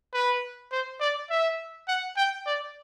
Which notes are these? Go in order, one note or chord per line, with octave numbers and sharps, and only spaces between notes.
B4
C5
D5
E5
F#5
G5
D5